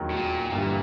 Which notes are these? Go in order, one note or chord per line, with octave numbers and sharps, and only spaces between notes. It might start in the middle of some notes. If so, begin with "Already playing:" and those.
Already playing: E1 D#2 D#3 F#3
A2
A#2
G1 G2 A#2 E3 G3